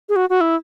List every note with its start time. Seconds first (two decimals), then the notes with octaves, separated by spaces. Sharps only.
0.09 G#4
0.16 F#4
0.30 F#4
0.41 E4